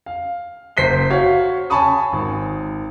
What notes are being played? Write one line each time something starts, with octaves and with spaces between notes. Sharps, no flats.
F5
F#1 C5 B6 C7 G7
F#4 C#5 F5
C#5 G#5 A5 B5 C#6 D#6
G#1